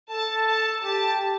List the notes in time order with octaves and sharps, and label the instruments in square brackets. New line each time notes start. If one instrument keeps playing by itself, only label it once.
[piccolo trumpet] A4 [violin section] A5
[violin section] A5
[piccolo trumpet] G4 [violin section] A5